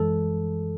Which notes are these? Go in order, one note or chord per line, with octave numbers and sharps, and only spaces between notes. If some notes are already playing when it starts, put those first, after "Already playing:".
Already playing: F#2 E3 G#3 A4